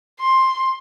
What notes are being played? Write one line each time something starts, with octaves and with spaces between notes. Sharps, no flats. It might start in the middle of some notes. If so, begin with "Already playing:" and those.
C6